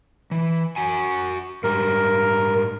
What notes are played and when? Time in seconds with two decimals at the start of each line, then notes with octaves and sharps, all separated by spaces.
0.31 E3
0.76 F#4 F#5 G#5
1.64 G#2 G3 A#4